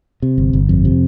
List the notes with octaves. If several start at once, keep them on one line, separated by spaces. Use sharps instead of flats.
C3
G1
G1
F2
C3